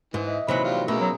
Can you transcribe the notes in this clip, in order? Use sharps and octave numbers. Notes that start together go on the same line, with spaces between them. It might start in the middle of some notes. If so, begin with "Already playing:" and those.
G#2 E3
D#5 E5
C3 E3 F#3 A#3 D#4 B5 C#7
G3 F4
B2 A3 A#3 C#4 G#4 A#4 E6
F#3